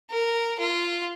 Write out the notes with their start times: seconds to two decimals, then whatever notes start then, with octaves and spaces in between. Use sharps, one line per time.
0.10 A#4
0.59 F4